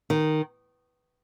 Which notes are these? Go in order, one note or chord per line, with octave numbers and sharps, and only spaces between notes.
D#3